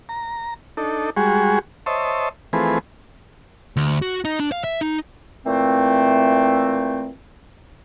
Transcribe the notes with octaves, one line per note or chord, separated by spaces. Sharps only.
A#5
D4 D#4 A4
G3 G#3 F#4 G#4 C#6
C5 C#5 D#5 E5 A5
E3 F3 A3 C4 G#4 B4
D2
F#4
D#4
D4
F5
E5
D#4
A#2 E3 A3 C4